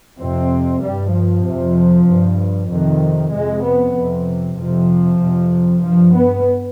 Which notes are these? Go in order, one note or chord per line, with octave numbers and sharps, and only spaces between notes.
F2 C3 C4
G2 G3
F3
F2 C3
G2
F2 C3 D#3
F2 C3 G#3
B3
F2 C3
F2 C3 F3
F2 C3
G2 F3
B3